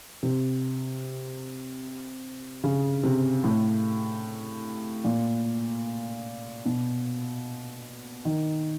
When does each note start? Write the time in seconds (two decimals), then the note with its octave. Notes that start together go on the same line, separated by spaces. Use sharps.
0.23 C3
2.64 C#3
3.03 C3
3.44 A2
5.04 A#2
6.65 B2
8.25 D#3